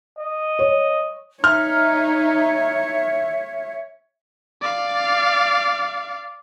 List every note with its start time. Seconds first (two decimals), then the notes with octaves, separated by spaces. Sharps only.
0.19 D#5
0.59 C#5
1.44 D#4 C#5 E5 F6
4.62 D5 F5